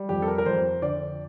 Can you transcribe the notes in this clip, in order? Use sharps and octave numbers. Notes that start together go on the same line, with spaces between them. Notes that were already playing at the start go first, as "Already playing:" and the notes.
Already playing: G3
F2 G4
A4
A#4
A#4
F2 C5
D3 D5